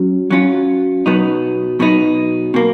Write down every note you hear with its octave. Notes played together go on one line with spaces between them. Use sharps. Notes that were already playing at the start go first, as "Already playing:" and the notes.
Already playing: F#3 C#4
F#3 C#4 F4
B2 F#3 B3 D#4
B2 F#3 B3 D#4
B2 A#3